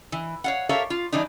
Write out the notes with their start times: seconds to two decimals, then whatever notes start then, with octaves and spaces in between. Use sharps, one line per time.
0.12 E3
0.44 C#5 F5 F#5
0.69 G4 A4 A#4 C#5 E5 F5
0.90 F4
1.12 E3 G3 D4 D#4